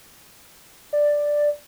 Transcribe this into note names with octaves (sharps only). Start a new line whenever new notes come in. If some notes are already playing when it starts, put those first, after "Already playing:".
D5